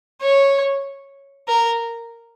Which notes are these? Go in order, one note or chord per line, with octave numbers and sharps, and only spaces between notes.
C#5
A#4